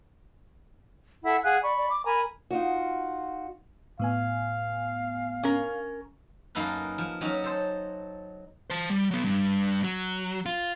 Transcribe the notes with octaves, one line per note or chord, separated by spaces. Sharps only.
E4 A4 F#5
G#4 F5 F#5 F#6
D5 B5 C#6
D5
D6
A#4 G#5 A#5 B5
D#4 F4 F#4
A2 B3 F5 G#5
C#4 A#4
F#2 A#3 D#4 A4 B4
F3
F#3 C#4 D#4
A4 C5
C5 A5
G3
F#3 B3
G2
F#3
F4